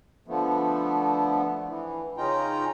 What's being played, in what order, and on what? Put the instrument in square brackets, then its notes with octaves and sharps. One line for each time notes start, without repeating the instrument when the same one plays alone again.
[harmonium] D3 F3 A3 B3
E3
C#3 C#4 D#4 F4 G5 A#5